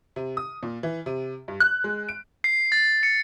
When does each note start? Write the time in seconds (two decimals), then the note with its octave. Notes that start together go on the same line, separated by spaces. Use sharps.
0.16 C3
0.37 D#6
0.63 A#2
0.83 E3
1.06 C3
1.48 G2
1.60 F#6
1.84 G#3
2.09 D7
2.44 C7
2.72 A6
3.03 C#7